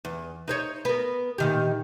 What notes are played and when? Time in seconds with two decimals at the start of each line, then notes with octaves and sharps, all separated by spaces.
0.05 E2
0.48 D#4 C5 C#5
0.85 B3 A#4
1.38 A#2 D#3 G4